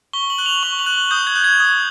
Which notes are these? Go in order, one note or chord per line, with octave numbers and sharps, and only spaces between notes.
C#6 G7
F#7
F#6
F7
C#6 G7
F#7
F#6
D#6 G6
G#6
F#6
G#6
D#6